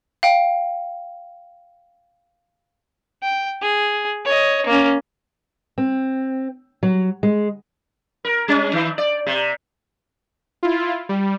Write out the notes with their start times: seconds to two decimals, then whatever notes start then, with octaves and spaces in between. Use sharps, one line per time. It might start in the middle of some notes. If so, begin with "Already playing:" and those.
0.23 F5 G5
3.23 G5
3.62 G#4
4.25 C#5 D#5
4.66 A#3 C#4
5.78 C4
6.83 F#3
7.23 G#3
8.25 A#4
8.48 G3 C#4
8.73 D#3
8.98 D5
9.27 C3
10.63 E4 F4
11.09 G3